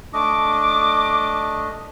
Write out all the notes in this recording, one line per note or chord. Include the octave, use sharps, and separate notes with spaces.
A3 D4 D#5 D6